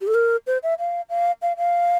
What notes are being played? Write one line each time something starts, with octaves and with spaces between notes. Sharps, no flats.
G4
A4
A#4
C5
E5
F5
F5
F5
F5